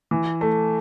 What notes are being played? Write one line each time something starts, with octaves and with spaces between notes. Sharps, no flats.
E3
A3